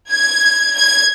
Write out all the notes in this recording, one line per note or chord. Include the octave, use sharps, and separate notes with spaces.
G#6
G#6